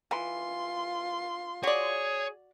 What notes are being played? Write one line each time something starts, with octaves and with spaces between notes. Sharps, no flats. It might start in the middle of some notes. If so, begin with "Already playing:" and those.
E3 F4 C6
F#4 G#4 C#5 D5